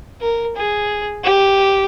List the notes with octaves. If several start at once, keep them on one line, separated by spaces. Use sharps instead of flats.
A#4
G#4
G4